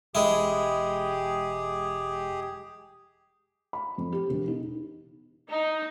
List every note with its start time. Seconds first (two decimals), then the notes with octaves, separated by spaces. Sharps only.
0.15 E1 G#3 E4 G4 G#4
3.73 B5
3.98 F2
4.13 G4
4.30 E1
4.48 D#4
5.49 D#4